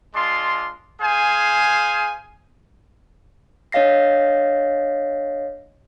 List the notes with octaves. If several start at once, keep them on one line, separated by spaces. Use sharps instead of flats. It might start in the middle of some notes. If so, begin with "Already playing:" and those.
G#3 D4 F4 C6
G#4 C5 F5 G#5
D4 C#5 D#5 F5 A#6 C7